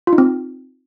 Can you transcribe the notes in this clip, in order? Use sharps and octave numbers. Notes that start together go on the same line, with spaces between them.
F4
D#4
C4